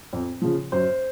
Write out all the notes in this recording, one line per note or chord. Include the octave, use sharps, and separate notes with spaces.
F2
C#3 F3
F#2 C5